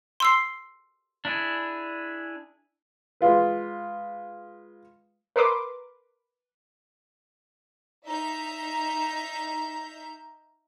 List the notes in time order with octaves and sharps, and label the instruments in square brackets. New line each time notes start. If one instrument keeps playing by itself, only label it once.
[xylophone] C6 E6 C7
[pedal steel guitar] D4 E4 G#4
[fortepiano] G#3 F4 B4
[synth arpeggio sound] A#4 B4 C6 D6
[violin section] D#4 E5 A#5 G6